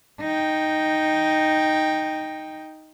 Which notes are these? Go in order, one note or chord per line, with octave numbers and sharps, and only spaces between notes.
D#4 G5